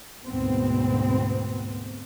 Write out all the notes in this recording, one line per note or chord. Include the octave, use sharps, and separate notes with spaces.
D2 G#2 B2 B3 C4